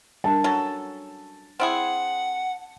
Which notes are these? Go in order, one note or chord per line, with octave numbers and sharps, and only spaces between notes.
G3 D4 A#4 A5
F#3 C#4 A4
C4 E4 G#4 F#5